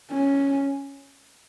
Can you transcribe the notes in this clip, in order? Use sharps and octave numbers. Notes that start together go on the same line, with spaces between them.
C#4